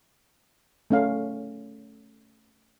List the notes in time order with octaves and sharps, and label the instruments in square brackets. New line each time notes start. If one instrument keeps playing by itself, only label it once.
[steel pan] A3 C#4 F5